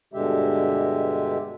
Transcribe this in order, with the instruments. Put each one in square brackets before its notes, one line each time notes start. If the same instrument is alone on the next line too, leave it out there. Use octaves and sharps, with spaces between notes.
[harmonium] G2 B2 D3 G#3 G4 E5